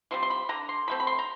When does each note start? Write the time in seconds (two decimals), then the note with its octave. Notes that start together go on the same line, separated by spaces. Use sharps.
0.11 G3 C4 F4 C6
0.23 C6
0.30 B5
0.49 D3 A#5
0.69 C6
0.88 F#3 A3 C4 B5
1.00 B5
1.07 C6
1.19 A#5